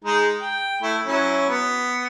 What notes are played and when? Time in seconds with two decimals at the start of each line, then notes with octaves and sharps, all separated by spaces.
0.04 G#3 D#4 G#4
0.41 G5
0.82 A3 E4
1.06 F#3 C#4 E4
1.49 B3